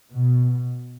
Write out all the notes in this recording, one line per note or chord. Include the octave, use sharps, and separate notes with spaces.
B2